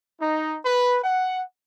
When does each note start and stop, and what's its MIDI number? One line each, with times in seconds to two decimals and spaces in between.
0.21 0.58 63
0.65 0.99 71
1.04 1.43 78